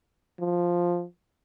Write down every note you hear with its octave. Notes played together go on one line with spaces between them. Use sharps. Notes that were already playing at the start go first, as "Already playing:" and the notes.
F3